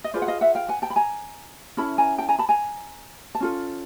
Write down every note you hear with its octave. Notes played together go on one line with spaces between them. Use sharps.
D#5
F4 G#4 B4 C5 D5
F#5
D#5 F5
E5 F#5
F5 G5
F#5 G#5
G5 A5
B5
G#5 A#5
C#4 E4 A4 A5 B5
G#5 A#5
G5 A5
G#5 A#5
A5 B5
G#5 A#5
A5
C#4 F4 A4